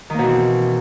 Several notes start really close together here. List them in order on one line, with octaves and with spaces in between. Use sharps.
D#3 A#3 B2 E3 C4